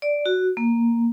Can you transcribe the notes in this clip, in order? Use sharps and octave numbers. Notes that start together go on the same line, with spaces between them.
D5
F#4
A#3